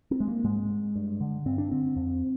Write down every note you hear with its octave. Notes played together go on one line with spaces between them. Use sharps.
C4
G#3
A#3
G#2 G#3
G2
D3
G2 C4
D4
D3 C4
F2